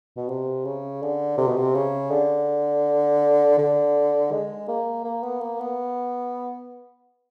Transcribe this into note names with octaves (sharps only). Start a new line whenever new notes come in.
B2
C3
C#3
D3
C3
B2
C3
C#3
D3
D3
G#3
A#3
A#3
B3
A#3
B3